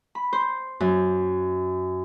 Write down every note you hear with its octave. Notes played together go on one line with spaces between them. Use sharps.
B5
C5
F#2